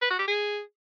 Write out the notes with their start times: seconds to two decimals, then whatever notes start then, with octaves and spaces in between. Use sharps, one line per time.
0.01 B4
0.10 F#4
0.19 G4
0.28 G#4